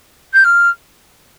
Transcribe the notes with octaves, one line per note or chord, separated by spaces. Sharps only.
G6
F6